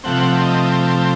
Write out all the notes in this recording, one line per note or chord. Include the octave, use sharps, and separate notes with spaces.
C3 F3 A3 C4 F#5
D#5